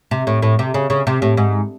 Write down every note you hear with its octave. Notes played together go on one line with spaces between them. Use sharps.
C3
A2
A2
C3
C#3
C#3
C3
A2
G#2